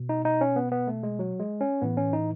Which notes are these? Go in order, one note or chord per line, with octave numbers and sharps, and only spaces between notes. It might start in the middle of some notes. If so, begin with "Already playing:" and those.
Already playing: B2
D#4
D#4
C#4
B3
B3
A3
G#3
F#3
G#3
C#4
A2 E3 B3
C#4
D#4